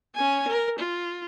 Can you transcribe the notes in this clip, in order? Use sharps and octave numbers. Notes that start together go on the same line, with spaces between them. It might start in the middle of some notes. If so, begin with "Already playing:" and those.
C#4 G#5
A#4
F4